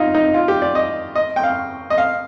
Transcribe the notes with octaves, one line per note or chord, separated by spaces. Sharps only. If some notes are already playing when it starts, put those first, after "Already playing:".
Already playing: D#4 F4
D#4
F4
G4
D5
D#5
D#5
G5
F5
D#5
F5